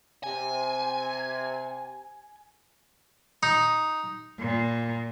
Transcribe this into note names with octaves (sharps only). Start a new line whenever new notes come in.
C3 G#5
D#4
A#2